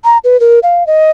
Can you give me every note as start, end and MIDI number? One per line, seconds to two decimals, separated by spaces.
0.04 0.18 82
0.24 0.40 71
0.40 0.59 70
0.63 0.86 77
0.87 1.11 75